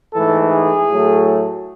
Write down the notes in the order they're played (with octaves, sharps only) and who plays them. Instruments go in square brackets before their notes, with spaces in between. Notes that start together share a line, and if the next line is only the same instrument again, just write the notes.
[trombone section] G#2 E3 A3 A4
G#4
A2 F#3 A3